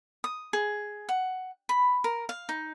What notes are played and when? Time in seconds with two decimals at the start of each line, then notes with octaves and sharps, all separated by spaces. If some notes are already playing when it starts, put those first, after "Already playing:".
0.24 D#6
0.53 G#4
1.09 F#5
1.69 B5
2.04 A#4
2.29 F5
2.49 D#4